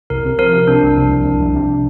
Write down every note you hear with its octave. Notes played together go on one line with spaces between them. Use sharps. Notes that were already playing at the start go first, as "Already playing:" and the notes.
C2 A#4
C3
F3 A#4
C3
C3 D4
C2
C2
C2
C2
C2
C3